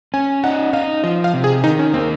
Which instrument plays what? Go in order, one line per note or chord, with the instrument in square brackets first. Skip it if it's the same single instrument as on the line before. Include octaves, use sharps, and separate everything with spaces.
[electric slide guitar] C#4 [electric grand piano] G#5
[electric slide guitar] D#4 [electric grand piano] F#5
[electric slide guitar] D#4 [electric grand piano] F5
[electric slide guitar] F3 [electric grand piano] D#5
[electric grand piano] F5
[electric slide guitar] C3
[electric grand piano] G#4
[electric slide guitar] D#3 [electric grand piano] D#4
[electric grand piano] C#4
[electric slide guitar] A#3 [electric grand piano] C4